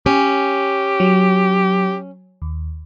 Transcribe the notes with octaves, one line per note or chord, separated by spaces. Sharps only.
C#4 G4
F#3
D#2